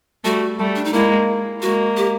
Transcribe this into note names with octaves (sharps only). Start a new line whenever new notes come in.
G3 A3 F#4
G3 A3
D4
D#4
G#3 A#3 E4
G#3 A#3 F#4
G4